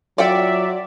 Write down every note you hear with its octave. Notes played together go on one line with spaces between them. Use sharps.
F#3 F4 D5 E5 F#5 G5